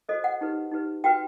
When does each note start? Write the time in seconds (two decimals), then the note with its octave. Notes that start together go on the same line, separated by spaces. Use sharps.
0.09 F#4 A4 C5 D#5
0.24 F#5
0.41 D#4 G4 B4
0.72 D#4 G4 B4
1.04 F#4 B4 G5